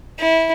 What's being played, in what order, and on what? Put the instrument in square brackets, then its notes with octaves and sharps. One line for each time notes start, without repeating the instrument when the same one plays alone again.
[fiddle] E4